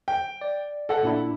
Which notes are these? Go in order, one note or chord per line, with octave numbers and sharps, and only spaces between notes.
G5
D5
A4 F#5
A#2 D4 E4